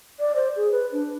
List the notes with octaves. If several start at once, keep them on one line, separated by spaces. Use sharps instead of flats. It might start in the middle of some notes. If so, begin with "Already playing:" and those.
D5
C5
G#4
B4
D4